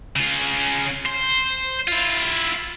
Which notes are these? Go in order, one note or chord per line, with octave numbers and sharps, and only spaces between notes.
C#3 F4
C5
E4 F4